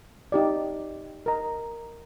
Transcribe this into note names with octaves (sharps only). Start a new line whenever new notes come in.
D#4 G4 D5
A#4 D#5 A#5